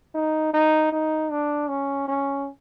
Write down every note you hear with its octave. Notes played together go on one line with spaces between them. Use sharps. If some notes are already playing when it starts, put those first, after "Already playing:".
D#4
D#4
D#4
D4
C#4
C#4